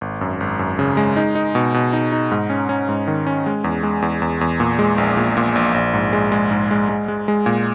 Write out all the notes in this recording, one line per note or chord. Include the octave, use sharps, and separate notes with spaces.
G#1
F#2
G#1
F#2
C#3
G#3
D#4
D#4
B2
B2
D#4
D#4
G#2
C#4
C#4
G#2
D#3
C#4
G#3
E2
G#3
E2
E2
E2
A#2
G#3
A#1
A#2
A#2
A#1
A#1
G#2
G#3
G#3
G#2
G#3
G#3
G#3
G#3
A#2